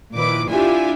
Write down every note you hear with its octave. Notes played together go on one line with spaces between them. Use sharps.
A#2 D#3 F3 E4 B4 D6
D4 E4 F4 G4 E5 G#5